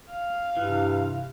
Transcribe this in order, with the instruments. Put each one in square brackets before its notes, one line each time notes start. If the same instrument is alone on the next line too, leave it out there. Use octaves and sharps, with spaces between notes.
[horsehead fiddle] F5
[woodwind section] G2 C3 [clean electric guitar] E3